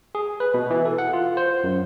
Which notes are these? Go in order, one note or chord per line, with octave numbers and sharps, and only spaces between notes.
G#4
B4
B2
E3
A4
F#5
F4
C5
F#2